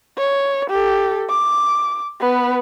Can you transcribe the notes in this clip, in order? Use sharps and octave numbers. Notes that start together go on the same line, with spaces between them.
C#5
G4 A4
D6
B3 B4